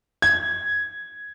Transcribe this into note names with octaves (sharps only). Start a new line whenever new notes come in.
G#6